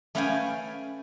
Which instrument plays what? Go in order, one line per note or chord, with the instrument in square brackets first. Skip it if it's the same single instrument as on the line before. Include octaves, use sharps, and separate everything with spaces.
[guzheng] A3 C#4 B4 F5 G5 G#5